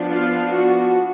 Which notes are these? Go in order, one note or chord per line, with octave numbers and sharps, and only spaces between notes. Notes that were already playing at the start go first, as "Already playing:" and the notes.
Already playing: F3 B3 D4
F4
F#4